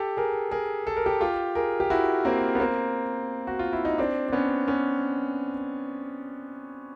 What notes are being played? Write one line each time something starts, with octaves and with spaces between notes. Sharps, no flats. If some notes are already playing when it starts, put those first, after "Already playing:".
Already playing: G4 A4
G#4 A#4
G#4 A#4
A4
A#4
G4 A4
F4 G4
G#4 A#4
G4
E4 F#4
A#3 C4
B3
A#3 C4
F#4
F4
E4
D#4
C4 D4
D4
B3 C#4
B3 C#4